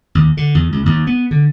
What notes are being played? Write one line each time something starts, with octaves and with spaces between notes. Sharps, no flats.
D#2
D3
E2
C#2
D#2
B3
D3